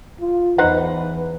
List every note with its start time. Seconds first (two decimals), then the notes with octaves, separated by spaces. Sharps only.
0.21 F4
0.58 E2 D#4 B4 C5 F#5